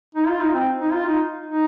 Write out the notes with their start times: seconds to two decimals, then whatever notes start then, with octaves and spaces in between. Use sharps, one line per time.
0.15 D#4
0.28 F4
0.41 D#4
0.54 C4
0.81 D#4
0.93 F4
1.06 D#4
1.46 D#4